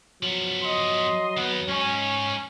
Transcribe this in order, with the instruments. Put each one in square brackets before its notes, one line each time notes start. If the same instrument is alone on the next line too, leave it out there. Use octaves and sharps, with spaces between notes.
[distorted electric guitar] F3 B3 [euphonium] F#3
[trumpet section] D#5 C6
[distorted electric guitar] D#2 D#4 [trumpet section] B3
[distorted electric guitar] G#2 D#4 [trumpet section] C#4